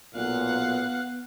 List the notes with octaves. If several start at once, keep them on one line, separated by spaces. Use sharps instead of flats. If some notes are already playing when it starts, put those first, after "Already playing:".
B1 A#2 B3 F5 F#5